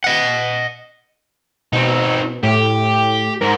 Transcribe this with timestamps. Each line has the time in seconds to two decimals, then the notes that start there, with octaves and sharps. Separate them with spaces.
0.04 D#5 F#5
1.73 B2 C4 D#4
2.43 A2 G4
3.41 G#2 A#4